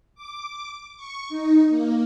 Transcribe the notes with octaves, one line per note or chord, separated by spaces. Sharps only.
D6
C#6
D#4
A#3